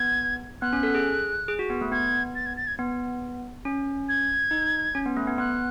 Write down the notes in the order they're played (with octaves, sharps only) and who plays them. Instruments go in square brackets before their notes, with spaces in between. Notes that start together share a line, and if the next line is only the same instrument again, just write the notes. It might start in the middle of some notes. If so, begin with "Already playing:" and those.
Already playing: [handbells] B3 [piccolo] G#6
[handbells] B3 [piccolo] F#6
[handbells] C#4
A4
G#4
G#4
F#4
B3
A3
[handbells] B3 [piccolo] G#6
[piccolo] A6
G#6
A6
G#6
[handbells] B3
C#4
[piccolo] G#6
[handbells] D#4
C#4
B3
A3
B3
[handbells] B3 [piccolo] F#6